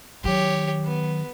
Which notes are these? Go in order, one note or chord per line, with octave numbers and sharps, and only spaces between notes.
D#3 F#3 G4 C#5
B3